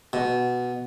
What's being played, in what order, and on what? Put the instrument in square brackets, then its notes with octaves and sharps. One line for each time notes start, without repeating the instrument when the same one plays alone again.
[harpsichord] B2